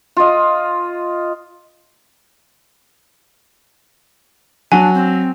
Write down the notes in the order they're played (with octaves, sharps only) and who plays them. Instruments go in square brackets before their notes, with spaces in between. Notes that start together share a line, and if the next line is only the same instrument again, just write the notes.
[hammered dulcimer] F4 D#5
[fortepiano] F#3 [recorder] D4 [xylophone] G#5
[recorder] C4